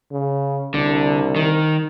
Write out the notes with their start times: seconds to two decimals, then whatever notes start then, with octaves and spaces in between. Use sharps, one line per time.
0.11 C#3
0.74 C2 D3
1.36 D#3